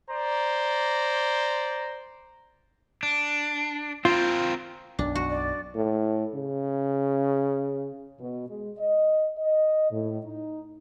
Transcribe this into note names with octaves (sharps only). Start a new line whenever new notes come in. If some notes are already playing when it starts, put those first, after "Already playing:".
C5 D5 A#5
D4
C4 F4 A#4
B1 F#2 D4
F#4
D5
A2
C#3
B2
G#3
D#5
D#5
A2
D#4